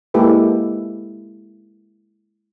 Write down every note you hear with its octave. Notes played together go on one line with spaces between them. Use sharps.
G#3 A#3 E4 G4 A4 B4